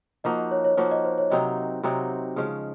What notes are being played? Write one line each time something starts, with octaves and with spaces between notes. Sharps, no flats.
F3 A#3 D#4 F#4 D#5
D#5
C#5
C#5
F3 A#3 D#4 F#4 C5
D#5
C5
C#5
C3 F#3 C4 D#4 D#5
C3 F#3 C4 D#4
C#3 F3 G#3 C#4